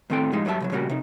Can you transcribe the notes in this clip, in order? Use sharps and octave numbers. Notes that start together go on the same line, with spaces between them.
A2 D#3 C4 A4 G5
A2 F3 G3 G#3 D#4
F#2 F#3 G3 G#4 E5 A5
C2 F3 F#3
A#2 C#3 G3 A#3 F#4 G4
C3 D#4